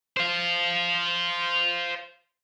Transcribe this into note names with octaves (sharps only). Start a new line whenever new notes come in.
C5 F5